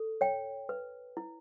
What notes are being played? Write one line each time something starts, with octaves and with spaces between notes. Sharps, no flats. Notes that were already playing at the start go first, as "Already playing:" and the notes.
Already playing: A4
C#5 G5
B4
E4